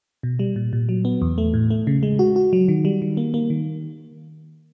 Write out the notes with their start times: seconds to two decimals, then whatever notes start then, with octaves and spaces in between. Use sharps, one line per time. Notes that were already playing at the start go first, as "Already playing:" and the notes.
0.23 B2
0.39 G3
0.56 A#2
0.73 A#2
0.89 F#3
1.05 B3
1.22 E2
1.38 A3
1.54 A2
1.70 A3
1.87 C#3
2.03 G#3
2.19 F#4
2.36 F#4
2.53 F#3
2.68 D#3
2.85 G3
3.02 D#3
3.17 A#3
3.34 A#3
3.50 D#3